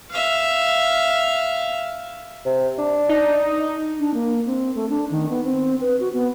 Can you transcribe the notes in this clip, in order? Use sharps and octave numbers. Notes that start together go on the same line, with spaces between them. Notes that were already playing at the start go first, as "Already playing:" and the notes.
E5 F5
C3
D4
D#4
D4
A#3
C4
A3
D4
D#3
B3
C4
B4
F#4
B3